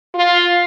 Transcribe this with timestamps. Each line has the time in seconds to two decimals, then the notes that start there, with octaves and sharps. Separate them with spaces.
0.15 F4